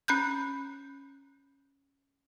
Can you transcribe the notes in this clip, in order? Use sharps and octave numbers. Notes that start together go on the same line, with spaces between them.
C#4 B5 F#6 G6